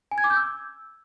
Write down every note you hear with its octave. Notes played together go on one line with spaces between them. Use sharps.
G#5
G#6
D6
G6
E6